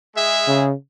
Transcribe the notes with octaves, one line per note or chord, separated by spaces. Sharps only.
G#3 G#4 E5
C#3